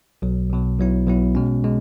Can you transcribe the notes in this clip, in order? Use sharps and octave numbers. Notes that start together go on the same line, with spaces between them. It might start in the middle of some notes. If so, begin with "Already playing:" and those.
B1 B2 F#3
B1 B2 F#3
B1 B2 F#3 B3 E4
B1 B2 F#3 B3 E4
B2 G#3 C#4
B2 G#3